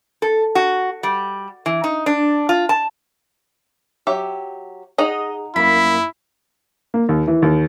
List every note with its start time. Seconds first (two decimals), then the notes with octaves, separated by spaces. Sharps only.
0.22 A4
0.55 F#4
1.03 G3
1.66 E3
1.84 D#4
2.06 D4
2.49 F4
2.69 A5
4.07 F#3 G4 E5
4.98 D#4 G#4 D#5 F#5 A#5
5.56 F#2 A#3 E4 B5
6.94 A#3
7.09 D#2
7.27 E3
7.42 D#2